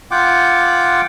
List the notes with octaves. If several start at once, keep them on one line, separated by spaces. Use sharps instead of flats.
F4 F#5 G5 D6